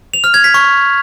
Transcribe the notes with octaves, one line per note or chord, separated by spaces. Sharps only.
F7
F6
G#6
B6
C#6